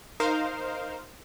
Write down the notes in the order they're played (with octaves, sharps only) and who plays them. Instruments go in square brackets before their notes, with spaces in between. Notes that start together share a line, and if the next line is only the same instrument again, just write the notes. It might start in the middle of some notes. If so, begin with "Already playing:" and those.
[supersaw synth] D#4 A#4 C5 F5